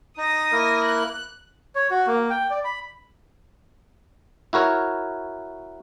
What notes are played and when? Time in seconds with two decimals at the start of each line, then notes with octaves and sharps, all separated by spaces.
0.18 D#4 D#6 A#6
0.52 A#3 E4 A#4
0.84 F#6
1.75 C#5
1.91 F#4
2.07 A#3
2.30 G5
2.50 D5
2.64 B5
4.53 E4 F#4 A#4 C#5